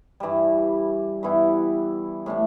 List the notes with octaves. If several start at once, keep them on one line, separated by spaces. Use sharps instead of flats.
G2 E3 G3
G2 E3 B3 E4
A2 E3 A3 D4